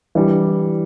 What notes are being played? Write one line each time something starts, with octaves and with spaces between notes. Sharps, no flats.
E3 G3 D4